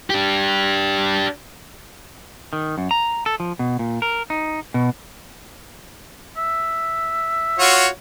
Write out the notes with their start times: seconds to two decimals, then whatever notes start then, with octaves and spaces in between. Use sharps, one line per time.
0.10 D4 G4
2.53 D#3
2.78 F#2
2.91 A#5
3.26 A4
3.40 F3
3.59 B2
3.79 A#2
4.02 A#4
4.30 D#4
4.74 B2
6.37 E5
7.59 F4 F#4 C#5